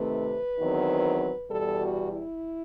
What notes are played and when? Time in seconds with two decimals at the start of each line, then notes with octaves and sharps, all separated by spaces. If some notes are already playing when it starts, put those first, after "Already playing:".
Already playing: C3 D#3 A3 C4 B4
0.57 E2 D#3 F#3 C4
1.50 E2 B2 G3 A4
1.81 F#4
2.12 E4